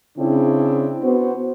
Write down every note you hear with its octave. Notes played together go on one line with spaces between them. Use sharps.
C#3 C4 D4 E4
B3 F#4 C5